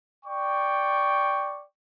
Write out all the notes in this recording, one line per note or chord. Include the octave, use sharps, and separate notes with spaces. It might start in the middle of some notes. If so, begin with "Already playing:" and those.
D5 G5 C#6